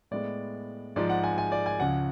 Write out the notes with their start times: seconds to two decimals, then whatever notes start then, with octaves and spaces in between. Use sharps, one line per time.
0.11 A2 G#3 B3 D5
0.96 G#2 F3 G#3 D5
1.09 F#5
1.24 G#5
1.38 G#5
1.52 D5
1.66 G#5
1.80 C#2 C#3 F3 F#5